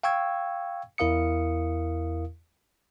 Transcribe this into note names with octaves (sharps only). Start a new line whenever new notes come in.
F5 G5 C#6 E6 G#6
E2 E4 A#4 F5 D#6 C#7